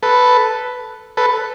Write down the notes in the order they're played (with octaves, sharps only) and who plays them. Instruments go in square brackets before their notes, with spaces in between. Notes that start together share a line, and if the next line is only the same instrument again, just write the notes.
[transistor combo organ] A4 B4
A4 B4